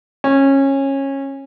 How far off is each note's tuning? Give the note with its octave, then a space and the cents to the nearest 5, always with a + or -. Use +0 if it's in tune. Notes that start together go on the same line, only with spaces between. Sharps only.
C#4 -20